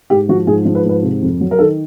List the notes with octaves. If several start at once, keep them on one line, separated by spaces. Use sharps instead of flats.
G#2 G4
F3 F#4
G#2 G#4
F3
B4
G#2 B4
C3
F2
F#3
A#4
D#3 A4